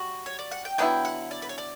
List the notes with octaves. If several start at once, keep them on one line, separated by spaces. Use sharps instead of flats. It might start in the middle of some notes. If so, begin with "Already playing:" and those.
Already playing: G3 F#4
C#5
D5
F#5
G5
D3 F#3 B3 E4 G5
F#5
D5
B4
C#5
D5